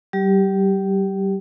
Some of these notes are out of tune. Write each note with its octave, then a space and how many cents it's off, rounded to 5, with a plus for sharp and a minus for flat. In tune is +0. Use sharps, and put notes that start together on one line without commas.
G3 -35 G4 +0